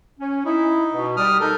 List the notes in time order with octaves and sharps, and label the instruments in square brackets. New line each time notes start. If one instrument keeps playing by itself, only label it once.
[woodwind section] C#4
[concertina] D#4 [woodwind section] E4
[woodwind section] B2
[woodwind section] G3 [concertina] D#6 F6
[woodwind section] D#4 [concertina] A4 A#4